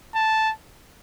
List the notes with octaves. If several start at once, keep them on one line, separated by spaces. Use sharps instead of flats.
A5